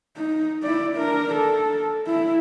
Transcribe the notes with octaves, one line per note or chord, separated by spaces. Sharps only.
D#4
E4 D5
D4 A#4
A4
E4